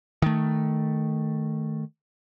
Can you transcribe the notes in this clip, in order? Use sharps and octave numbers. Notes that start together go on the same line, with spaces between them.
D#3 A3